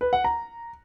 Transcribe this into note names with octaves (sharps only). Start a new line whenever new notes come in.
B4
F#5
A#5